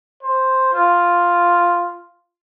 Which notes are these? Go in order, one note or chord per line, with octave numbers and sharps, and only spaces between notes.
C5
F4